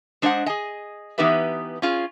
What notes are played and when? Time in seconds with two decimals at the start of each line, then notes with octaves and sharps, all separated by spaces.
0.22 G#3 D4 C5 C#5 D#5 F#5
0.46 G#4 D#5
1.18 E3 B3 D#4 G4 B4 E5
1.82 C#4 F4 G#4